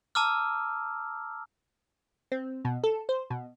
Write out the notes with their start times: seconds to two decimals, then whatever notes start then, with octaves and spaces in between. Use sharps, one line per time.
0.15 A5 A#5 D6 E6 F6
2.32 C4
2.65 B2
2.84 A4
3.09 C5
3.30 B2